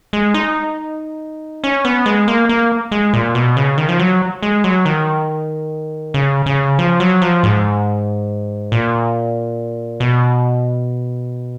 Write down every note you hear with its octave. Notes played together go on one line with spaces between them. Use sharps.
G#3
D#4
C#4
B3
G#3
A#3
A#3
G#3
A#2
B2
C#3
D#3
F3
F#3
G#3
F#3
D#3
C#3
C#3
F3
F#3
F3
G#2
A#2
B2